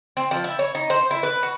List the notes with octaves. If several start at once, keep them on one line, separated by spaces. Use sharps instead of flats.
C4
F3
E4
C#5
D#4
C5
E4
B4
F#4